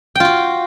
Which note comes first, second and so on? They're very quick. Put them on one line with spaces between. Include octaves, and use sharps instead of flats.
G5 F4 F#4